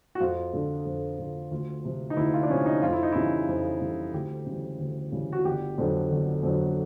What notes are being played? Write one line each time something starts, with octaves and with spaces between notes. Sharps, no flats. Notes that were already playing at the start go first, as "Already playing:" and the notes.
F#4
F2 F4
D3 F3
F2
D3 F3
D2 F4
C3 F3
D#4
D2 E4
F4
D4
C3 F3 C#4
D#4
F2 F4
E4
D#4
C#3 E3 G3 E4
F2
C#3 E3 G3
D2 G4
C#3 E3 G3
D2
C#3 E3 G3
F#4
G1 G4
F2 D3 F#3
G1
F2 D3 F#3